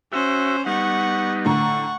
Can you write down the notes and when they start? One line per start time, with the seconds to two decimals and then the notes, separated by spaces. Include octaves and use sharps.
0.12 C#4 F#4 C5 E5
0.66 G3 B3 D#4 F#5 C#6
1.45 A2 D3 F#5 A#5 C#6